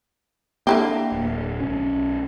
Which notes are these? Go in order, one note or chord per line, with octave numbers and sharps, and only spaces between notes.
D3 A#3 E4 G4
D1
B1 C#4